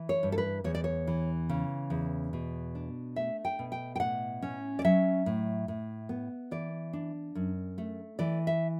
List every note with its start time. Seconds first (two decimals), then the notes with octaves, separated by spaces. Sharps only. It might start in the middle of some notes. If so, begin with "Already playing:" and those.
Already playing: E3
0.09 C#5
0.23 G2
0.32 A4
0.38 B4
0.64 E2 C#5
0.75 D5
0.84 C#5
1.07 E3
1.49 C#3
1.90 E2
2.33 B2
2.75 D4
3.16 A3 E5
3.45 G5
3.59 B2
3.72 G5
3.96 G5
4.00 A2 F#5
4.42 C#4
4.79 D5
4.85 F#3 E5
5.26 A2
5.68 A2
6.09 B3
6.51 E3 D5
6.93 D4
7.35 F#2
7.78 A3
8.19 E3 D5
8.47 E5